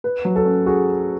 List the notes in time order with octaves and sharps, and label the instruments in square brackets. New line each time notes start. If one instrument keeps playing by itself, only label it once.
[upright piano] B4
F#3
[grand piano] A4
[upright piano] C#4
[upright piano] F#4 [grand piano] G#4